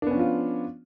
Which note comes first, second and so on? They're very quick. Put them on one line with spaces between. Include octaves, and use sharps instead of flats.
D4 B3 C#4 F3 F4